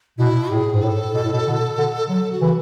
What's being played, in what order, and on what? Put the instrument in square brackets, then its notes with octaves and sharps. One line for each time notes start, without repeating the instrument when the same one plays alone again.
[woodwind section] B2 [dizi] E4
[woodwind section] A2 [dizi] G#4
[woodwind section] G#2
[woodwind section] A2 [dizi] A4
[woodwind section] B2
A2
B2
B2 D3
B2 D3
[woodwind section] D3 F#3 [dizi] A4
[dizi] F#4
[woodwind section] C#3 E3